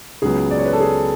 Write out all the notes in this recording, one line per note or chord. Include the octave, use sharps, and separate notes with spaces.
C#2 C#3 F#3 B3 G#4
D5
C#5
B4
A4
G#4